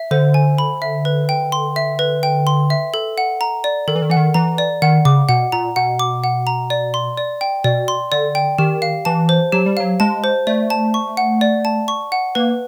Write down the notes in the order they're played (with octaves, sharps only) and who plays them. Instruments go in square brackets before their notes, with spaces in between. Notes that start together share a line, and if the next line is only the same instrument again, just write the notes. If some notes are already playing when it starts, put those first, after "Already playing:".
Already playing: [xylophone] E5
[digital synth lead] D3 [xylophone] C5
[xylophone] G#5
B5
E5
B4
G5
C6
E5
B4
G5
C6
E5
A4
F#5
A#5
D5
[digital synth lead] D#3 [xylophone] A4
[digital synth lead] E3
D#3
[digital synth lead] E3 [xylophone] F#5
[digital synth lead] D#3
[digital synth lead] E3 [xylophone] A#5
[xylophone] D5
[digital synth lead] D#3 [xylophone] F#5
[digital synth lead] C#3 [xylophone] D6
[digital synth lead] B2 [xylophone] F#5
[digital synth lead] A#2 [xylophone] A#5
[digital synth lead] B2 [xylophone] F#5
[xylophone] D6
F#5
A#5
D5
C6
D5
G5
[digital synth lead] B2 [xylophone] D5
[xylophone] C6
[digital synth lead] D3 [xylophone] D5
[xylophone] G5
[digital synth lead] D#3 [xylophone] G4
[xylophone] F5
[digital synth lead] E3 [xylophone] A5
[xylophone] C5
[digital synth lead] F#3 [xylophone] G4
[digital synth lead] G3
[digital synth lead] F#3 [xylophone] F5
[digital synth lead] G#3 [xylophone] A5
[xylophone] C5
[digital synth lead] A3 [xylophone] D5
[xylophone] A5
C#6
F#5
D5
A5
C#6
F#5
[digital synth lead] A#3 [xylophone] B4